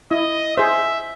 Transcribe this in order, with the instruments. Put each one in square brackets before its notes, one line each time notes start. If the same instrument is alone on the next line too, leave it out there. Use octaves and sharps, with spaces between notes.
[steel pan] E4 [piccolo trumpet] D#5
[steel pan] G#4 C5 [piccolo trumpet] E5